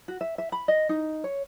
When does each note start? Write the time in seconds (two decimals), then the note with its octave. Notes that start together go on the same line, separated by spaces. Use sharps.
0.08 F#4
0.21 E5
0.38 E5
0.52 B5
0.68 D#5
0.89 D#4
1.24 C#5